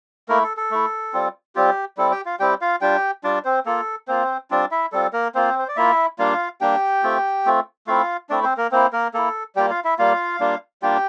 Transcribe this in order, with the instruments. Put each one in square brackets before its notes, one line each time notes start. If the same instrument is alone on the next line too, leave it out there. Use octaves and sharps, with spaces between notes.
[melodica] A3 A#3 E4 A#4
A4
A4
A3 E4
G3 C4 F4
G3 C4 F4 G4
G3 C4 E4 A4
G4 G5
F4 F5
G3 C4 E4 G4 G5
F4 F5
G3 D4 F4 G4 G5
G3 D4 F4 D5
C4 C5
A#3 F4 A4
A#3 C4 F4 C5
G3 C4 D4 F4 D5
E4 E5
G3 C4 F4 A4
A#3 A#4
A#3 C4 F4 C5
C5
D5
A#3 E4 F4 E5
G3 A#3 D4 F4 F5
G3 A#3 D4 G4 G5
A3 C4 F4
A3 C4 F4
A3 C4 E4 F4 F5
A3 C4 D4 E4 D5
C4 C5
A#3 A#4
A#3 C4 E4 C5
A#3 A#4
A#3 E4 A4
G3 A#3 F4 G4 G5
F4 F5
E4 E5
G3 A#3 F4 F5
G3 A#3 D4 F4
G3 A#3 D4 F4 G4 G5